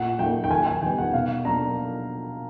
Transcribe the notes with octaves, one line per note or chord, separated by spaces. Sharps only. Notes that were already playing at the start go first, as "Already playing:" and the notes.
Already playing: A#2 F#5
F#3 A#3 D#4 G5
G5
D#2 G#5
G#5
D#3 G3 B3 G5
F#5
B2 F5
F#3 A#3 D4 A#5